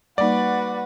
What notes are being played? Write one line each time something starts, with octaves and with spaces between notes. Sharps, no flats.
G3 A#3 D#4 F#4 B4 D5 F#5